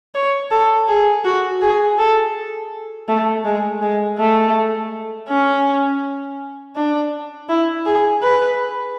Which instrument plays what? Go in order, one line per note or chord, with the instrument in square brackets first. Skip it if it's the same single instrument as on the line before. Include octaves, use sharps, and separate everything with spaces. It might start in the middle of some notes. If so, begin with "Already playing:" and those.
[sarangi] C#5
A4
G#4
F#4
G#4
A4
A3
G#3
G#3
A3
C#4
D4
E4
G#4
B4